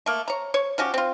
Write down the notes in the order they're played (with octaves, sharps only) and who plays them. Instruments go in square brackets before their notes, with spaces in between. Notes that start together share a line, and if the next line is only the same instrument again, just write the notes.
[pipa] A3 A#3
C#5 A#5
C#5
F3 C#4 F#4 G4
C4 F4